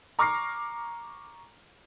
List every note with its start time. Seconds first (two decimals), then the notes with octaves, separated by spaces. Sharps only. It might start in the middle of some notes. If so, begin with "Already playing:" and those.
0.19 A#5 C#6 D6 F6 A#6 C7